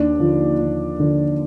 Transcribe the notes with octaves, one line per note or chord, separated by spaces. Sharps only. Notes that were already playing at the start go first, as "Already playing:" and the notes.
Already playing: D#2 D4
D3 F3
D#2
D3 F3